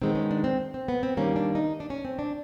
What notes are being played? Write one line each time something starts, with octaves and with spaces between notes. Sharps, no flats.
D#3 G#3 B3 C4
C#4
D4
C4
C4
B3
C4
D#3 G3 A#3 C#4
D4
D#4
D4
C#4
C4
D4